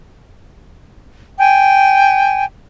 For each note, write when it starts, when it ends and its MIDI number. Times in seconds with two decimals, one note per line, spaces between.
1.39 2.45 79
1.39 2.45 80